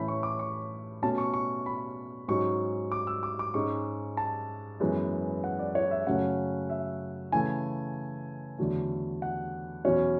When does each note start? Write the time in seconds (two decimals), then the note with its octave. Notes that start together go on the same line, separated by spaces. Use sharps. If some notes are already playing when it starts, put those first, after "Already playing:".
Already playing: A2 E3 A3 C#4 B5
0.08 C#6
0.23 D6
0.39 C#6
1.02 B2 A3 C#4 A5
1.18 C#6
1.34 C#6
1.66 B5
2.28 G#2 F#3 C#4 C#6
2.92 D6
3.07 E6
3.23 D6
3.39 D6
3.54 G#2 G#3 C#4 C#6
4.17 A5
4.80 F#2 E3 G#3 B3
5.44 F#5
5.59 D5
5.75 C#5
5.91 E5
6.06 F#2 C#3 F#3 A3 C#4 F#5
6.70 E5
7.32 C#3 E3 A3 G#5
8.58 E2 D3 F#3 A3
9.22 F#5
9.85 E2 B2 F#3 C#4 C#5